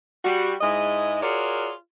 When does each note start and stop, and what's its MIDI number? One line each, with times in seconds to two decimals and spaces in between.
0.25 0.53 55
0.25 0.53 66
0.61 1.22 44
0.61 1.22 56
0.61 1.22 64
0.61 1.22 75
1.23 1.72 65
1.23 1.72 66
1.23 1.72 68
1.23 1.72 70
1.23 1.72 73
1.23 1.72 74